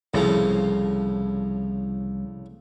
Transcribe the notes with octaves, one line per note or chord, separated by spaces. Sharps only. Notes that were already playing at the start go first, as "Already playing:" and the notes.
C2 A2 C#3 F3